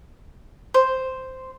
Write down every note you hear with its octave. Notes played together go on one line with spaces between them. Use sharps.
C5